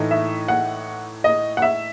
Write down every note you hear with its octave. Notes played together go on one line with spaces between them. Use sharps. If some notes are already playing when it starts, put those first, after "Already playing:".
Already playing: A2 E3 A3 D#4
E5
F#5
D#5
F#5
E5